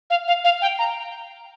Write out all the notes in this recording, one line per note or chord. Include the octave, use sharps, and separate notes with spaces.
F5
F5
F5
G5
A#5